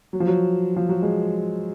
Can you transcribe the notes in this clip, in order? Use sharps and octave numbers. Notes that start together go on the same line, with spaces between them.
F#3
F3
F#3
F3
F#3
G#3